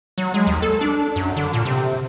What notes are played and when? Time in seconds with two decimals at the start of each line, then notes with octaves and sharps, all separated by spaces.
0.18 F#3
0.34 G#3
0.47 D#2
0.62 A4
0.81 D4
1.16 F#2
1.36 D3
1.53 A#2
1.65 C3